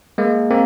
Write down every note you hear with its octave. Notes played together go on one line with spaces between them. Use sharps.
G#3 A#3
A#3 C4